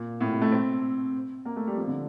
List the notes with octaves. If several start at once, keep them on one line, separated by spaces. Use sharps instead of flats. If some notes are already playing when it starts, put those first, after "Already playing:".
Already playing: A#2
A2
C3
A3
C4
A#3
A3
G3
F3
D3